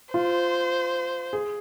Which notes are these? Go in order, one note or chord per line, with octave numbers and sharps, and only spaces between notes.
F4 C5
G#4